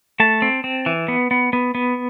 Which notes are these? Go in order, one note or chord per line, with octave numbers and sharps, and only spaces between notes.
A3 A5
C4
C4
E3
B3
B3
B3
B3